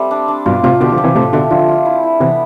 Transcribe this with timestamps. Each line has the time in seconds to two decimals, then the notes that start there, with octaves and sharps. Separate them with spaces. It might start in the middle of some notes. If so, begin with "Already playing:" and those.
Already playing: G3 A3 C4
0.11 D4
0.28 D4
0.46 G2 B2 F4
0.63 A2 C3 F4
0.80 B2 D3 G4
0.92 D3 F3
0.98 G4
1.04 C3 E3
1.15 A2 C3 A4
1.33 B2 D3 A3
1.50 D3 F3 F4
1.68 F4
1.86 E4
2.03 E4
2.20 C3 E3 B3